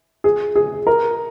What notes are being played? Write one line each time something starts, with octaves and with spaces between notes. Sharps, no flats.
G#4
G#4
A#4